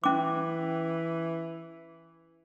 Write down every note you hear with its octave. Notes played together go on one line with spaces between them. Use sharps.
E3 C#4 D6